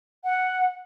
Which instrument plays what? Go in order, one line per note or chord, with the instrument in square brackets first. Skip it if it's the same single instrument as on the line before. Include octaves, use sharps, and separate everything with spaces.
[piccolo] F#5